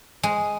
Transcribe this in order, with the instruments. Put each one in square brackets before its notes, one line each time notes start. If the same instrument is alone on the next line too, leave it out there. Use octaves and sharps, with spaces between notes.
[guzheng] G#3